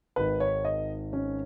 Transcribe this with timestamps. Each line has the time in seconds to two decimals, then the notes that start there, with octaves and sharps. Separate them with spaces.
0.16 G#1 G#2 D#3 B4
0.40 C#5
0.65 D#5
1.13 C#4